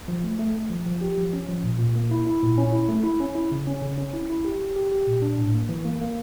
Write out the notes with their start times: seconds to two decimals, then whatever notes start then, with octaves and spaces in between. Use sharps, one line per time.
0.08 F3
0.24 A3
0.39 A3
0.54 A3
0.70 F3
0.86 F3
1.01 G4
1.18 F3
1.33 C#4
1.49 F3
1.63 A#2
1.79 A#2
1.96 A#3
2.11 E4
2.27 E4
2.42 A#2
2.58 C#4
2.72 E4
2.89 A3
3.04 E4
3.20 C#4
3.35 E4
3.52 C#3
3.67 C#4
3.82 C#3
3.98 C#4
4.14 E4
4.30 E4
4.45 G4
4.60 G4
4.76 G4
4.92 G4
5.07 A#2
5.22 D4
5.38 A2
5.54 A#3
5.69 E3
5.85 A#3
6.01 A#3